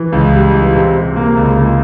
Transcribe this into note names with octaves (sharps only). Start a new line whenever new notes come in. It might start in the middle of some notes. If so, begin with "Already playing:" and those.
Already playing: E3
C#2
G3
E3
C3
C3
A#3
C#2
C#2